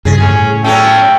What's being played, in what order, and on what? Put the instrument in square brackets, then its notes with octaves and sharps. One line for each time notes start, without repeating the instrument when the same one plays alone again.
[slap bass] G2 C#3 [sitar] G#4
[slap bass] A2 [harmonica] C#4
[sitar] F#3 C#4 [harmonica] A4 E5 G5